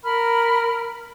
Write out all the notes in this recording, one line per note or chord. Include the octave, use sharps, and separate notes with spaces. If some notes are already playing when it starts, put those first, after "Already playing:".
A#4 B5 F6